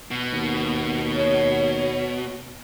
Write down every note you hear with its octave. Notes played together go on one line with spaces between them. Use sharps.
B2
D#2
C#5